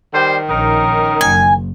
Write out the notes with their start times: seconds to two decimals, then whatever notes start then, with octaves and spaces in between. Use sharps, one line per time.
0.14 D#3 G3 C5
0.49 A#1 C#4 D#4 A#4
1.21 F#1 G#5